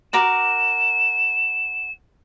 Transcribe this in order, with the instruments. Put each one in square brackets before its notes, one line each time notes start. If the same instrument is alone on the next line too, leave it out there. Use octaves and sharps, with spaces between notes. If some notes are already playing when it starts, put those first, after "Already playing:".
[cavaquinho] F#4 A#4 D6 [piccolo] E7